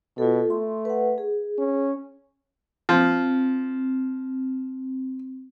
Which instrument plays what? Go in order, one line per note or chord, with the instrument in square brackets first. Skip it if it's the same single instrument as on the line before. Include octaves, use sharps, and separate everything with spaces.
[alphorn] B2 [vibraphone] F4 A4
[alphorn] A3 [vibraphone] C6
[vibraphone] B4 F#5
G#4
[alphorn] C#4
[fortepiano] F3 [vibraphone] C4